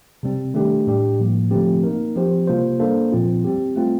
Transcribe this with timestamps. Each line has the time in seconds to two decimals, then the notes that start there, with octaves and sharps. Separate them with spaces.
0.23 C3 G3 C4
0.54 D#3 A3 D4 G4
0.87 A2 G3 D4 G4
1.19 A2 F3 A#3
1.51 D3 F3 A3 C4 G4
1.84 A#3 D#4 A#4
2.16 F3 C4 G4 C5
2.47 C3 G3 A#3 F4 C5
2.80 A#3 D4 A4 C5
3.12 A#2 F3 C4 F4
3.44 G3 C4 G4
3.76 A3 C4 F4